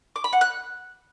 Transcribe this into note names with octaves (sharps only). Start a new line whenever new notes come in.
D6
B5
F#5
F#6